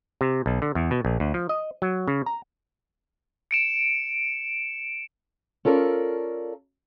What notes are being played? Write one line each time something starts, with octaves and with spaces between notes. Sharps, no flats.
C3
B1
D3
E2
B2
A#1
D2
F3
D#5
F#3
C#3
A#5
C#7 D7 E7
C#4 F4 A4 A#4 D5